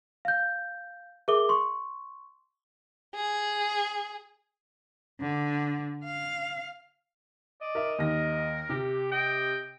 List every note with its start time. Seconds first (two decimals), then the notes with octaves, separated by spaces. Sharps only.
0.25 F5 G6
1.28 G#4 A#4 E5 D6 G7
1.49 C6 C#6
3.15 G#4
5.20 D3
6.04 F5
7.61 D5 D#5
7.75 A#4 E5
7.98 D#2 A#4 A#6
8.69 C3 G4
9.12 D#5 G5